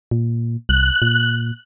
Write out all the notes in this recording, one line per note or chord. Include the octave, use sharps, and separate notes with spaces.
A#2
C2 F#6
A#2